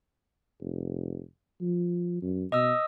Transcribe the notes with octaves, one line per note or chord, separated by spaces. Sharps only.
F1
F3
F#2
B2 D#5 D#6 E6